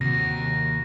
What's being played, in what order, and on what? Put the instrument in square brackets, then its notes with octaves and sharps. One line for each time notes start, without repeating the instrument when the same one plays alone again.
[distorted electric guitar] D#2 [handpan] C3 F#4 [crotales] A#6